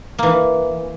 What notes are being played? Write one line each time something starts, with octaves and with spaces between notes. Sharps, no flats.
E3 A#3